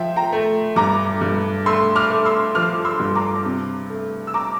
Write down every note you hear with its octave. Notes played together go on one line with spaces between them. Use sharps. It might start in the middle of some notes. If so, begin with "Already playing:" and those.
Already playing: F3 E5 G5
G5 A#5
A3
G2 A#5 D6
G2
A3 C6 E6
D6 F6
A3
C6 E6
F3 D6 F6
C6 E6
G2
A#5 D6
C3
A3
E6
A#5 D6